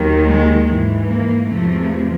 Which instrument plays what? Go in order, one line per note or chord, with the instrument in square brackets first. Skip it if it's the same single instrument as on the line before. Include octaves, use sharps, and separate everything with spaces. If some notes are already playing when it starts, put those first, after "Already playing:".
Already playing: [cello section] D#2 D#3 F#3
G#3
G#2 E3
A#3
E2 C3 F3 A3